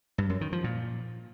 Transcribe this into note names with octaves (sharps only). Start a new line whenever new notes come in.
G2
F#2
D#3
F3
A#2